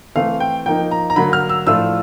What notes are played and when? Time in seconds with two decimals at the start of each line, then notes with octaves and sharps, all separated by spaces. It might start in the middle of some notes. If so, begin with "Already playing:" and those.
0.16 E3 A3 C4 E4 F5
0.40 G5
0.66 F3 A#3 D#4 G5
0.91 A#5
1.10 A#5
1.16 D3 F#3 A#3 B5
1.33 F6
1.49 E6
1.67 A2 F3 A3 D4 F4 E6